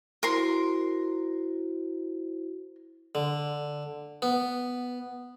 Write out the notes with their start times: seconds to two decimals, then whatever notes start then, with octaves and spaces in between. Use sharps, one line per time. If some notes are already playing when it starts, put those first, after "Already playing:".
0.23 E4 F#4 A#4 C5 C6
3.15 D3
4.22 B3